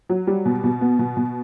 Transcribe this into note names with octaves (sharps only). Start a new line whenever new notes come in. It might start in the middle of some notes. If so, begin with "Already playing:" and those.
F#3
G3
B2
B2
B3
B2
B2